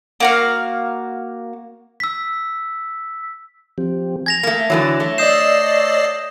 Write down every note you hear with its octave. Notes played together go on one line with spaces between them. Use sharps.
A#3 F#4 F5
E6 B6
F3 C4 G4
G#5 G#6 A#6 F7
A3 A#3 A#6
D3 E3 F#3 C#5 E6
A3
D5 D#5 D#6 G6 C7 E7